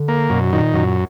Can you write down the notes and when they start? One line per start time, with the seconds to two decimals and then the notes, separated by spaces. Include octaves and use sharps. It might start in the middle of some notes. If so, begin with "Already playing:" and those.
Already playing: D3
0.08 A#3
0.30 F#2 B2
0.52 A#2 D#3
0.74 F#2 A#2